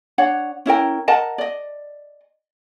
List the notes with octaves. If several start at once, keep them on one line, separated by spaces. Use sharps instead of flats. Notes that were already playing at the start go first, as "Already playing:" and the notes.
D4 C#5 F#5
C#4 E4 A#4 G5
A#4 D#5 F#5 A5
D5 D#5